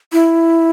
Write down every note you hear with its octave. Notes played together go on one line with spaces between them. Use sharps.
E4